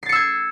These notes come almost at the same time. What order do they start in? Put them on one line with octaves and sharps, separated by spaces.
C7 A6 C#7 E6 G#6